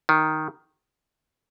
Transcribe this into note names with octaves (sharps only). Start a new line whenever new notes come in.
D#3